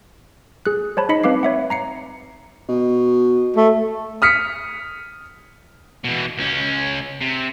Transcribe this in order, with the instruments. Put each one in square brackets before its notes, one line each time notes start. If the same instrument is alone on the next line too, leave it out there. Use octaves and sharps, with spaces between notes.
[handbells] G#4 F#6
C5 C#5 A5 B5
D#4 D#5 B5 B6 C#7
C4 B4 F5 D6 C7
C#5 E5 F#5
A#5 C7 C#7
[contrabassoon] B2
[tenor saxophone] A3
[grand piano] D#6 F6 B6 C#7
[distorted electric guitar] B2 E3
C#2 C#4
C3